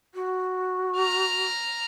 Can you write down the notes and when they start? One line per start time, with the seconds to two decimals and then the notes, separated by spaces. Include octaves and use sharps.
0.15 F#4
0.98 A#5 F6